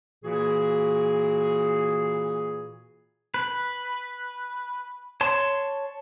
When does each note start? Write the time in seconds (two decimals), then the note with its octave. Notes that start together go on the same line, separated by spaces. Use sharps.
0.23 A#2 E3 A#3 F#4 G#4
3.34 B4
5.21 C#5 A5 C6